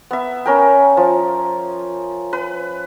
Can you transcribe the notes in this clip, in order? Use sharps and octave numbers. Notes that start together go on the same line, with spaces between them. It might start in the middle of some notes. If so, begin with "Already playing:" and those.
B3 E5
C#4 A#4 G5
F3
B4